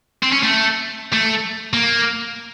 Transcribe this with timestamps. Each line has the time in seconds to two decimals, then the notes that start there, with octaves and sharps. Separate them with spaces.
0.23 C4
0.32 C#4
0.43 A3
1.13 A3
1.73 A#3